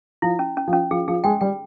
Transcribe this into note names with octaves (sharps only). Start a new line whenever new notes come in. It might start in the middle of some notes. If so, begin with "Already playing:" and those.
F3 E4
C#4
C#4
F3
C#4
F3 G#4
F3 G#4
G#3 G5
G3 G5